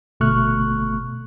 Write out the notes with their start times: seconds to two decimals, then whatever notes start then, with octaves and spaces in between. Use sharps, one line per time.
0.20 G1 B2 A3 C#6 F6 F#6